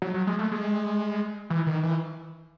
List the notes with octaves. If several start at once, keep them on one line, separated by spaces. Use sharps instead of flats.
F#3
F#3
G#3
A3
G#3
E3
D#3
E3